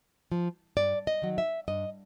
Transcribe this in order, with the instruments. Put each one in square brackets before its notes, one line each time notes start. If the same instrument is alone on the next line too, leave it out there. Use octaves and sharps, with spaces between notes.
[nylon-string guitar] F3
G2 D5
D#5
D#3 F#3
E5
G2 D#5